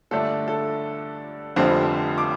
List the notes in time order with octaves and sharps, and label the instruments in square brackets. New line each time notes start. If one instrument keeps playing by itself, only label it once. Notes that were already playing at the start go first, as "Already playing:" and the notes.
[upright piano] G2 D3 A3 D4 A4
A4
F1 F2 D3 G3 C4
D6